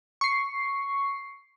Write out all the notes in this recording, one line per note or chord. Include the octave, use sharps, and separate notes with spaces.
C#6 C7